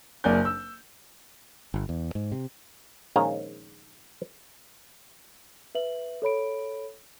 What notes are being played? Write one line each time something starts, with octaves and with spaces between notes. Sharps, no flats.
F#1 A#3 D5 G#5 G6
E6
G1
E2
G#2
C3
A#1 D#3 G#3 C#4 F5 A#5
B4 E5 F#7
A4 C#5 B5 D7